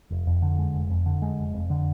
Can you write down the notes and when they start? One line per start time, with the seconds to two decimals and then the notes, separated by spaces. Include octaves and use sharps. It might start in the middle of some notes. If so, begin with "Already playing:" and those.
0.10 F1
0.27 F2
0.42 D3
0.59 G#3
0.74 F1
0.90 F2
1.06 D3
1.22 G#3
1.38 F1
1.54 F2
1.70 D3